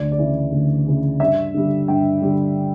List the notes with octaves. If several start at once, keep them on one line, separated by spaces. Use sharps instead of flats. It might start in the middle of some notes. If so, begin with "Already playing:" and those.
Already playing: D2 D5
D5
C#3 E3
D2
C#3 E3
G2 E5
D3 G3
G2 G5
D3 G3